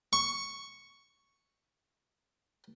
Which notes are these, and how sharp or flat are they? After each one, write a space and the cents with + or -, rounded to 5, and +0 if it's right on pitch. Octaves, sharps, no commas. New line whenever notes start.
C#6 +0